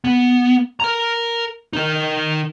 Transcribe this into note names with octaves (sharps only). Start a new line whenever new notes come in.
B3
A#4 A#5
D#4 A#4